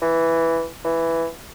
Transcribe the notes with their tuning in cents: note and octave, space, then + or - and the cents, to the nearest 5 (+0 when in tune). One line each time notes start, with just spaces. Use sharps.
E3 +0
E3 +5